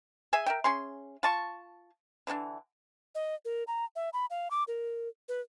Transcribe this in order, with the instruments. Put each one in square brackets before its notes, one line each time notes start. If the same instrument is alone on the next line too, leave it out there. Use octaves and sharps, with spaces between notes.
[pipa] G#4 E5 G#5
A#4 E5 G5
C#4 G#4 C6
F4 A5 C#6
D3 E3 C4 D4
[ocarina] D#5
A#4
A#5
E5
B5
F5
D6
A#4
B4